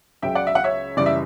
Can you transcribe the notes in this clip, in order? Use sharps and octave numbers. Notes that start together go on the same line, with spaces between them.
C#2 C#3 F#3 E5 G5
D5 F#5
E5
F#5
C#5 E5
F#1 F#2 E3 G3 D5
E5